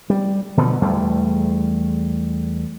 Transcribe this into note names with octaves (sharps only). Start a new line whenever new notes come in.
G3
B2 D3 F3
E2 G3 A3